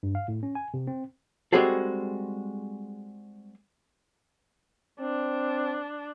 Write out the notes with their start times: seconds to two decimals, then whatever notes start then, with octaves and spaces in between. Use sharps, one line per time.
0.03 G2
0.15 F5
0.28 A2
0.43 C#4
0.55 G#5
0.74 C3
0.87 C4
1.53 G3 G#3 C4 F#4 G#4 A4
5.00 C4 D4